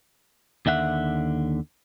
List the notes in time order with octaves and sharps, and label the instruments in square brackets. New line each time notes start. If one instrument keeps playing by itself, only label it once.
[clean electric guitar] D#2 D3 E5 F#5